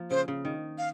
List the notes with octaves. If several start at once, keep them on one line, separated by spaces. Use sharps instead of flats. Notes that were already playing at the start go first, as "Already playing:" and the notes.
Already playing: F3 A#3
C#3 C5
C#3
D#3
F5